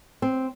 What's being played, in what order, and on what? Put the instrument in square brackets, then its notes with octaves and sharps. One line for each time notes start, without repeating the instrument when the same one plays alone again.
[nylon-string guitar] C4